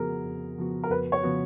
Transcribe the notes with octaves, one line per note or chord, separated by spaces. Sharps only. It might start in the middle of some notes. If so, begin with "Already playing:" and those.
Already playing: F2 C#3 F3 B3 F#4 G#4 A#4
F2
C#3 F3 B3 F#4
A#4
F2 B4
C#5
C#3 F3 B3 F#4